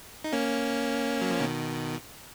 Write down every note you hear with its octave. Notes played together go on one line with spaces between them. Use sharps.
D#4
A#3 C#4
F#3
F3
B2 D#3